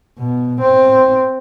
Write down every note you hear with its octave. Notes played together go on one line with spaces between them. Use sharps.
B2
C4